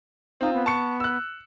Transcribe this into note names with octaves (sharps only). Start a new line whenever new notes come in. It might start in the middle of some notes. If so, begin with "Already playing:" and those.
C4 D#4 F4
B3
A5 C#6 C#7
E6 F#6